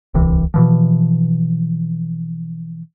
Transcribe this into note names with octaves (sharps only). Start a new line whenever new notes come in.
D1 C2 C3 E3
B2 E3 F3